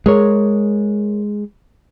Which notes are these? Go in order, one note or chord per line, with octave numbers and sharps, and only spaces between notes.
G#3 G#4 A#4 C#5